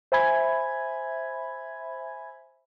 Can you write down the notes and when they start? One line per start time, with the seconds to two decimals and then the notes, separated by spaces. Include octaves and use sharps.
0.12 C5 E5 G#5 B5 G#6